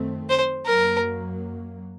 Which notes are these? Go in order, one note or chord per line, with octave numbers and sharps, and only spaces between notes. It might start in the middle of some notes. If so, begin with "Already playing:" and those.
Already playing: F#2 D#3 A3 C4
C5
F#2 F#3 A#3 A#4